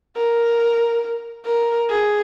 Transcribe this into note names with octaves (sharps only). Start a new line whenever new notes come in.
A#4
A#4
G#4